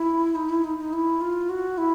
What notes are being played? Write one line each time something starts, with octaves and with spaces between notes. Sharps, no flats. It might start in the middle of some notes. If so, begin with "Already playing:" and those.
Already playing: E4
D#4
E4
D#4
D#4
E4
F4
F#4
E4